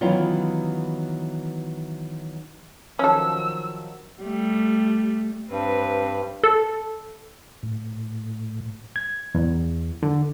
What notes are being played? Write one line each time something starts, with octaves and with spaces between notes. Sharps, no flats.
D#3 E3 F#3 B3 C#4 F4
D#3 F3 F#3 C#4 A4 E6
G3 A3
G2 C4 B4
A4
A2
G#6
E2
D3